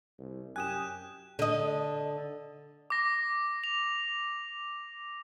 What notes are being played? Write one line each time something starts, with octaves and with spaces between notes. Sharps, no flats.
C2
F#2 G4 G#5 D#6 F#6 E7
D3 D#5
D6 A#6
F7